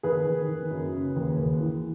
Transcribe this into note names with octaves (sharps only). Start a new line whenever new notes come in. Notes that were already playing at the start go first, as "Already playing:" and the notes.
D#3 G#4 B4
D#3
D#3
F#2
C#3
D#2
D#2
E3